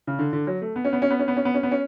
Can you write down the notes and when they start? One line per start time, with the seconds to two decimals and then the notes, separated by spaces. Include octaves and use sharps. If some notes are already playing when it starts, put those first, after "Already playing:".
0.07 C#3
0.19 D3
0.33 D3
0.47 F#3
0.62 A3
0.76 B3
0.85 C#4
0.93 B3
1.02 C#4
1.10 B3
1.19 C#4
1.28 B3
1.37 C#4
1.45 B3
1.54 C#4
1.63 B3
1.71 C#4